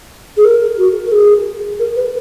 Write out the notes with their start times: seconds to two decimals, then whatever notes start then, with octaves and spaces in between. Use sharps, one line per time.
0.37 G#4
0.44 A#4
0.77 F#4
1.06 A#4
1.11 G#4
1.79 A#4
1.96 B4